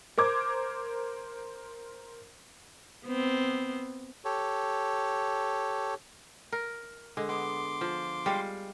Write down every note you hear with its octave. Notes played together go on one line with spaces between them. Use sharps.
A#4 C5 D6 G#6
B3 C4
G4 A4 C#5
A#4
D3 G#3
B3 C6 D6
F3
G3 G#3 F5